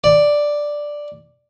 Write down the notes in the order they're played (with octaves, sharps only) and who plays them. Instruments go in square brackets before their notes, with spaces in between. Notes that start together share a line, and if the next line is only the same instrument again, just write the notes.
[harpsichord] D5